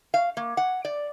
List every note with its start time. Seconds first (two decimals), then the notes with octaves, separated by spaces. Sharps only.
0.14 F5
0.37 A#3
0.57 F#5
0.85 D5